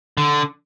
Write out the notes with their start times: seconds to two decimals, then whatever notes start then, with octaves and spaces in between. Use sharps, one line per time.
0.18 D3